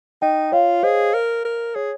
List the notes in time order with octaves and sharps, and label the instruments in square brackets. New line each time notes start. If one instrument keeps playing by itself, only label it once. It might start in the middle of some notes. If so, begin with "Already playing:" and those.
[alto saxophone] D#4 [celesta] D#5 G5
[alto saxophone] F4 [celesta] C#5 F5
[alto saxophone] G#4 [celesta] C5 D#5
[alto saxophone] A#4
A#4
[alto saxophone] G#4 [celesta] C#5